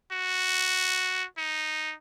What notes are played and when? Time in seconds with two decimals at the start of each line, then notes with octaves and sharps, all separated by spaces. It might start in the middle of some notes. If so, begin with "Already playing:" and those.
0.12 F#4
1.38 D#4